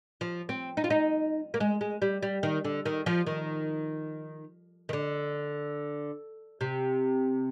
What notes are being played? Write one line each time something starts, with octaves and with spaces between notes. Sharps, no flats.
F3
C4
D#4
F4
D#4
A#3
G#3
G#3
G3
G3
D#3
D3
D#3
F3
D#3
D#3
D3
C3